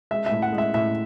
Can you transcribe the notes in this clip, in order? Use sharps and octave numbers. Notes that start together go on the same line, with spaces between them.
G#3 E5
E5
A2
F#5
G#3
E5
A2 E5